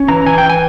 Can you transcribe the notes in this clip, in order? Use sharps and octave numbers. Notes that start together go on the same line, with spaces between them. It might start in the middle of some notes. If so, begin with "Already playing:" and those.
Already playing: C#4
E3 A#5
E3 G#5
G5
E3
G#5